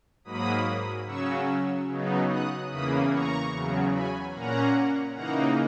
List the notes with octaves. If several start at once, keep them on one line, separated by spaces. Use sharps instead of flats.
G#2 F#3 A#3 B5 D#6
C#3 F#3 C#4 C#6 E6
C#3 F#3 B3 D#4
D#6 F#6
E2 C#3 E3 A#3 B5 D#6
A#5 C#6
E2 C#3 F#3
G#5 B5
A#2 A#3 C#4 F#5 A#5
C#3 E3 A#3 D#4 F#5 A#5